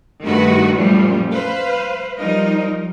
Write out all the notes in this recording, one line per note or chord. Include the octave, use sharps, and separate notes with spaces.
G2 D#3 A3 F#4 B4
F#2 A#2 F3 G3 A3
B4 C5 F5
F3 G3 D#4 A#4 D#5